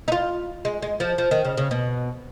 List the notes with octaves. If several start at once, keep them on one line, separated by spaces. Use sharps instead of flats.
D#4
F4
G#3
G#3
F3
F3
D#3
C#3
C#3
B2